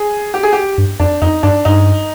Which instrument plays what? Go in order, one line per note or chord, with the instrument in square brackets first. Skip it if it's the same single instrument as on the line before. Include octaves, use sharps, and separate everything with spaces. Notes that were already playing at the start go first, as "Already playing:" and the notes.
Already playing: [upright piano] G#4
G4
G#4
G4
[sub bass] G2
[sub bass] F2 [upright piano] D4
[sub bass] F2 [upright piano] D#4
[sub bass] G2 [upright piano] D4
[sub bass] G2 [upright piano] D#4